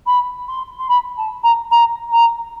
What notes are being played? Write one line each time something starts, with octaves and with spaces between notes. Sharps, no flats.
B5
C6
C6
B5
A5
A#5
A#5
A#5